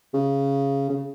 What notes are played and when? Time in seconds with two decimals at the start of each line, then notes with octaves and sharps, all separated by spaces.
0.14 C#3
0.90 C#3